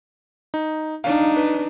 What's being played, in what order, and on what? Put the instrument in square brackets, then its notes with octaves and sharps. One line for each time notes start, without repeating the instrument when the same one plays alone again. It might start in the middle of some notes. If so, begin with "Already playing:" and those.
[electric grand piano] D#4
[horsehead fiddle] D4 D#4 [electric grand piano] F5
[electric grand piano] B4